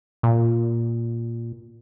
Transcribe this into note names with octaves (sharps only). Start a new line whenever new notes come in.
A#2